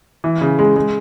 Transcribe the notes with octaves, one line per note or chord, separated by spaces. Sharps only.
E3
C#3
G#3
G#3